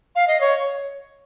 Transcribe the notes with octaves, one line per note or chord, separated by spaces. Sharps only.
F5
D#5
C#5